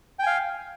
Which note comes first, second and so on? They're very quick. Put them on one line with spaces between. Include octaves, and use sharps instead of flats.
G5 G#5 F5